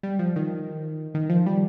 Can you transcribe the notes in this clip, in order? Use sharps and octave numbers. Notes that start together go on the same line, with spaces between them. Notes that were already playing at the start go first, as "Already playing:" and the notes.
G3
F3
D#3
D#3
F3
G3